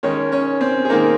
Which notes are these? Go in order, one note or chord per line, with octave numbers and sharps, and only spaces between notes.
D#3 G#3 C#4 D#4 C#5
C#4 C#5
C4 C5
G#4
D#3 G#3 A#3 D#4 A#4